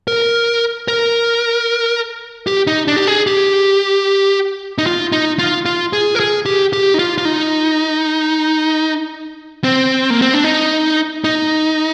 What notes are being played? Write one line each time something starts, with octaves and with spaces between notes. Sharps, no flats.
A#4
A#4
G4
D#4
D4
G4
G#4
G4
D#4
F4
D#4
F4
F4
G#4
A#4
G#4
G4
G4
D#4
F4
F4
D#4
C4
A#3
C4
D4
D#4
D#4